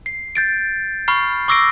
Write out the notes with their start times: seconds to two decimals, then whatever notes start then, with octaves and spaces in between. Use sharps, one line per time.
0.06 C7
0.35 G6 A6 D7
1.08 B5 C#6 F6 C7
1.48 C#6 D6 E6 A#6 C7 D7